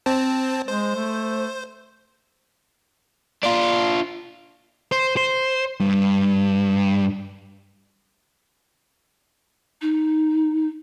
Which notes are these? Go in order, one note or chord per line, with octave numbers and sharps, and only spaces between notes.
C4 C5 A5
G#3 C5
A3
D4 F4
C5
C5
G2
D#4